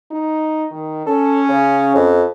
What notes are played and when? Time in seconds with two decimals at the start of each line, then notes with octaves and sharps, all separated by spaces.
0.11 D#4
0.71 D#3
1.06 C#4 A4
1.49 C#3
1.95 F2